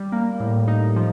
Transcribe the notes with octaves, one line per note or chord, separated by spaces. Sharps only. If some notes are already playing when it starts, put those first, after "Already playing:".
Already playing: G3
A#3
A2
D#4
F3